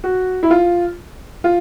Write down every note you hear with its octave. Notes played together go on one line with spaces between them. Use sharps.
F#4
E4
F4
F4